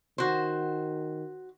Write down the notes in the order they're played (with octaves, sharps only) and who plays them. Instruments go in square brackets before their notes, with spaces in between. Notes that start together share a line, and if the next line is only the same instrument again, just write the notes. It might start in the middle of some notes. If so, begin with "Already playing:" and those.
[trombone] D#3 [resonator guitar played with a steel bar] F#4 C5